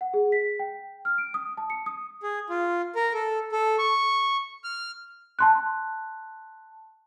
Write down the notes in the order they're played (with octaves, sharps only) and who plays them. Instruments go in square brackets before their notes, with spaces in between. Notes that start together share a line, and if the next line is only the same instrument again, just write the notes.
[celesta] F#5
G#4
B6
G5
F6
D7
D#6
A5
C#7
D#6
[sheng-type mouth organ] G#4
F4
A#4
A4
A4
C#6
F6
[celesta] A5 C6 F#6